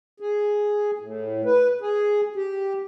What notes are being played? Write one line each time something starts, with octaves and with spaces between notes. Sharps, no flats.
G#4
A2
B4
G#4
G4